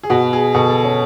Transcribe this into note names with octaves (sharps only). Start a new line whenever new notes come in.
G#4
B2 F#4
G#4
B2 A4
A4
C#4